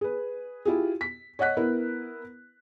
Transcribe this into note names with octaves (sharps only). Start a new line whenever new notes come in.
G#4 B4
E4 F4 G4 G#4
B6
C#5 D#5 F#5 F#6 B6
B3 E4 A#4 B4